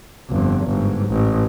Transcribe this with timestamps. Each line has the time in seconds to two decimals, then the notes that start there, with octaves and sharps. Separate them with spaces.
0.30 G1 F2
0.65 G1 G#2
1.09 A1